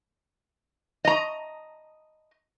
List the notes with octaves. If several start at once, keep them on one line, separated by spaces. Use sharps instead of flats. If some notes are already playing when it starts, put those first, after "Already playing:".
D#5 A#5